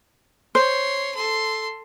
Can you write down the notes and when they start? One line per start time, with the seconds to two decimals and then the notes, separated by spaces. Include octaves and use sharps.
0.55 C5 C#5 C6
1.14 A4 C6